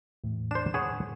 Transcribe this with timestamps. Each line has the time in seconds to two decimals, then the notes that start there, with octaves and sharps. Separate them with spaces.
0.24 E2 A2
0.51 D4 C5 E7
0.74 G#4 B4 C#5 F#5